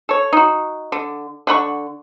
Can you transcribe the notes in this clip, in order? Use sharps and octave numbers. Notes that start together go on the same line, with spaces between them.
A4 C#5
D#4 F#4
D3
D3 F#5 B5 C#6